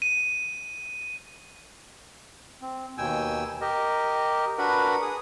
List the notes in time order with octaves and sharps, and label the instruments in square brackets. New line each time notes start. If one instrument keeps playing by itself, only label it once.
[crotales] D#7
[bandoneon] C4
D#2 B2 G5 G#5 E6
G4 A#4 D#5
D4 F#4 A#4 B4 F#5 B5
G#4 D#6